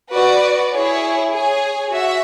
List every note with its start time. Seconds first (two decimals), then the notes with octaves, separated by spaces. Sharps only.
0.14 F#4 B4 D5
0.74 E4 G#4 C#5
1.32 G#4 C#5 G#5
1.92 F#4 E5